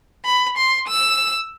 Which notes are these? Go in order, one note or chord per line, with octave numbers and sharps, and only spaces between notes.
B5
C6
E6